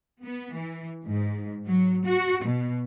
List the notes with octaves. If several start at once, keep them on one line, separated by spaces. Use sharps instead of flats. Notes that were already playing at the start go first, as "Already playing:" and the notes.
B3
E3
G#2
F#3
F#4
B2